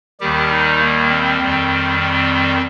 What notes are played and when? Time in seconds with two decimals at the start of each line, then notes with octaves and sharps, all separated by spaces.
0.20 D#2 D#3 G3 G4
0.50 D#4
0.80 A#3
1.10 C4
1.40 F2 D#3 G3
1.99 C4